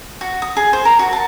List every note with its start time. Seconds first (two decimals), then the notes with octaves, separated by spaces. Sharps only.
0.21 F#4
0.42 D#6
0.57 G#4
0.73 C5
0.85 A#4
0.99 F#4
1.13 A5